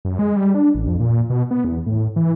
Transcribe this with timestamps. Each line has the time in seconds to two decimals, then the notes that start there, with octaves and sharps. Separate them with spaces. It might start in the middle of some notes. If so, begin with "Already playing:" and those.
0.05 F#2
0.19 G#3
0.36 G3
0.54 D4
0.75 A1
0.87 F2
0.99 A#2
1.30 B2
1.51 B3
1.65 E2
1.86 A2
2.16 E3